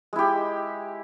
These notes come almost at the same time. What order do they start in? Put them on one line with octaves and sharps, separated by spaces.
G#3 E4 G4